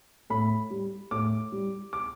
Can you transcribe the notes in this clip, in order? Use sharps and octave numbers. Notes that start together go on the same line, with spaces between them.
A2 B5
G3
A2 D6
G3
D6